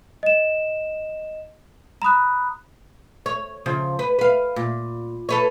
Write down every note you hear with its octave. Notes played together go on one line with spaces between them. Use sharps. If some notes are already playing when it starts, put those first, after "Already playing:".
D#5 E7
A#5 B5 D#6 F#6
C#5
C#3 F3
B4
B4 F5
A#2
A4 B4 C#5